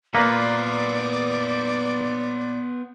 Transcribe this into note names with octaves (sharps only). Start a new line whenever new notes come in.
A#2 A#3 B3 F4 B4 C5 D5